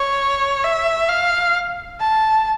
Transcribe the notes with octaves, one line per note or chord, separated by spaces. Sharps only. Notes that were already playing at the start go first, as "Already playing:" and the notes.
Already playing: C#5
E5
F5
A5